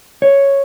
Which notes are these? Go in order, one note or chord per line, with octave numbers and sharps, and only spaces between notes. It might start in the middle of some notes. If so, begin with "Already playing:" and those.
C#5